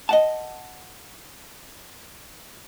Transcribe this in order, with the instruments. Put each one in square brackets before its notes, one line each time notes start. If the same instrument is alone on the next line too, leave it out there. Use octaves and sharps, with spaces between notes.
[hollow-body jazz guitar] D#5 F#5 A5